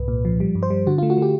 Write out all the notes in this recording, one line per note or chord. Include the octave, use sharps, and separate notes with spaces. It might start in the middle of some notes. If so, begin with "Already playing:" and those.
Already playing: C2 G#2 B4
A#2
F3
G3
G2
C5
G3
D3 F#4
F4
A3
F#4
A3 G4